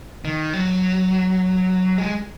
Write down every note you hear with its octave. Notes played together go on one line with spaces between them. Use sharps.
D#3
F#3
G#3